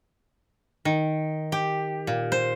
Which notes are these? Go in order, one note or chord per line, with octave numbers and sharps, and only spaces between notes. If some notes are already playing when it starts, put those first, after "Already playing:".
D#3
G4
A#2
C5